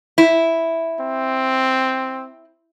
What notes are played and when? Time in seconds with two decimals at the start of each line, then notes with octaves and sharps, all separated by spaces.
0.18 E4
1.00 C4